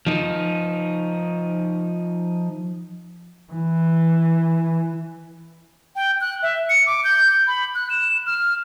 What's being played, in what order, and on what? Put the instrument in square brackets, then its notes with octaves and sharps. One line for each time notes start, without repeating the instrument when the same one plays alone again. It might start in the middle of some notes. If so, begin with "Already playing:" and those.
[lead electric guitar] F3 D#4
[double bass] E3
[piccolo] G5
F#6
E5
C#7
D6
G6
B5
F#6
E7
F6